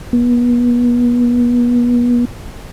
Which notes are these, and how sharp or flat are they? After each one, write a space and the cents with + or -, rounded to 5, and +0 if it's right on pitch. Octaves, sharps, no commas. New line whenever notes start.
B3 -35